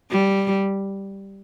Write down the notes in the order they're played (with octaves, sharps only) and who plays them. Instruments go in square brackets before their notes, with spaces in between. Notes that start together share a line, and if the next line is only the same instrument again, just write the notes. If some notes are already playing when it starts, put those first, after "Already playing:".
[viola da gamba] G3